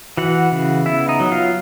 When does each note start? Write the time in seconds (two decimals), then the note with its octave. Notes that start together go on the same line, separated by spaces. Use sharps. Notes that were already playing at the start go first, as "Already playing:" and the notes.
0.17 E3 F#4 F#5
0.52 C#3
0.86 B3 E4 E5
1.09 D#4 D#5
1.20 F#3
1.32 F4 F5